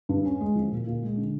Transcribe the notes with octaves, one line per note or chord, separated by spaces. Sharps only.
G2
C#4
G#3
F3
A#2
A#2
G#3
D3